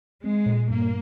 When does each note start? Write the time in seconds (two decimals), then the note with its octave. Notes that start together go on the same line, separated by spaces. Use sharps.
0.24 G#3 C4
0.46 A#2
0.70 G2 A#3